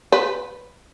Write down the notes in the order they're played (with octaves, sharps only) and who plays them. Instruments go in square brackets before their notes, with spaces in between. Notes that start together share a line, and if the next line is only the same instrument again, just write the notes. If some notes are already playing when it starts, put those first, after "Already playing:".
[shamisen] B4